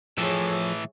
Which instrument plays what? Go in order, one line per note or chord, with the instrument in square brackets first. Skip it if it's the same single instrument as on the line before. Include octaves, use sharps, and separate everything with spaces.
[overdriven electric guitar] A2 E3 [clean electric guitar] F3 A4 [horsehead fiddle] G#4 C#5